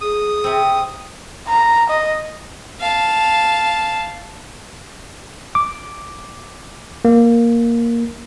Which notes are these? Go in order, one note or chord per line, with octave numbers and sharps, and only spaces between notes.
G#4 D#6
C3 C4
A#5
D#5
F5 A5
D6
A#3